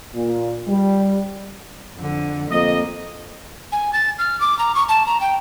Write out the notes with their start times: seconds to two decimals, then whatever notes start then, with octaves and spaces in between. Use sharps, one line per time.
0.15 A#2
0.68 G3
1.96 F2 D3
2.51 F2 A#3 D#5
3.72 G#5
3.93 A6
4.19 F6
4.40 D6
4.59 A#5
4.75 C#6
4.89 A5
5.06 A#5
5.21 G5